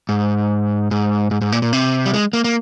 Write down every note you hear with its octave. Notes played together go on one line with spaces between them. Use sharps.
G#2
G#2
G#2
G#2
A#2
A#2
C3
G3
G#3
A#3
A#3